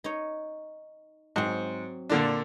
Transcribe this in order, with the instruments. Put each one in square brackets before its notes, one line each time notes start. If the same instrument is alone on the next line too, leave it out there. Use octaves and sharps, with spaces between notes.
[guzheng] D#4 C#5
[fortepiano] G#2 [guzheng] F#3 C4
[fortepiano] A#2 D3 D4 [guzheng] F4 A#4